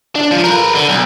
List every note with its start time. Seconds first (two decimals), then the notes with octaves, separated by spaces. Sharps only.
0.16 D4
0.32 F3
0.44 A#4 B4
0.75 D3
0.89 B1